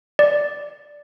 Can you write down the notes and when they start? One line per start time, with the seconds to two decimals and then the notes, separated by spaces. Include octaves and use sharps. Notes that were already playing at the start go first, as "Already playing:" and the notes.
0.19 D5